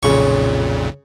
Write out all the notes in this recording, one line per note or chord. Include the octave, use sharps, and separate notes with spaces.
B1 F2 A#2 C#3 C#6